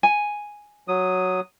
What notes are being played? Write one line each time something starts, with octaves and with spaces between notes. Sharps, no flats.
G#5
F#3 D#6